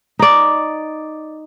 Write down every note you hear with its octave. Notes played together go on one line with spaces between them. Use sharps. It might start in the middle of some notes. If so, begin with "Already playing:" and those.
D#4 D5